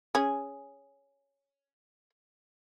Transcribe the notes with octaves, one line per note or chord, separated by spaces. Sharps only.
C#4 G#4